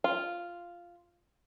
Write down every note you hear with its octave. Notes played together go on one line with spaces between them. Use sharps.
F4